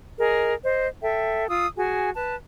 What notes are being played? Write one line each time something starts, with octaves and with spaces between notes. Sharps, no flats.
G#4 A#4 D#5
C5 D#5
A4 E5 G5
F4 D#6 E6
F#4 G#4 G#5
B4 A5